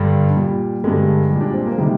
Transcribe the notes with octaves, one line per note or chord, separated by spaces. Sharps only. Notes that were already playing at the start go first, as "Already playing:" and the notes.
Already playing: G2 D3 G3
A#2 G3
G2 D3 G3 G#3
A#2 G3
D4
C4
A#3
C3 D#3 G3 G#3